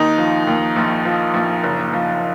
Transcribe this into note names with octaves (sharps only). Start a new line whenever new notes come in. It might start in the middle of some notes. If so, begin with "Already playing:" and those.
Already playing: D#2 D#4
F3
D#2
A#1
F3
A#1
F#1
F3